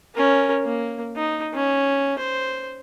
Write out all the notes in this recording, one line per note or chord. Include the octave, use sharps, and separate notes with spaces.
C#4 A#4
A#3
D#4
C#4
C5